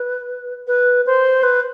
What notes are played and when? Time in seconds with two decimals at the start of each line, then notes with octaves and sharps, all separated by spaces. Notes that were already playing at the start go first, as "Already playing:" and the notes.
Already playing: B4
0.67 B4
1.06 C5
1.43 B4